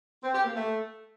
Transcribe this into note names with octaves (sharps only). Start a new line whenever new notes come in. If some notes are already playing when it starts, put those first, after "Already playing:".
C4
G4
A#3
A3